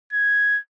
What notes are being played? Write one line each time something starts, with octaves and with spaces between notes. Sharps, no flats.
G#6